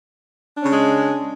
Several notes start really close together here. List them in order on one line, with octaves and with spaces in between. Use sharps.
D4 C#4 C#3 G#3